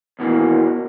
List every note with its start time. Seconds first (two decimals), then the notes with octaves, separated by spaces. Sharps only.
0.19 D#2 B2 E3 A#3